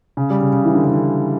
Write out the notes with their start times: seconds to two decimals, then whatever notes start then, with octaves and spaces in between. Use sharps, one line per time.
0.17 C#3
0.30 G3
0.41 C#3
0.53 C#3
0.65 E3
0.75 D3
0.85 C#3
0.94 D3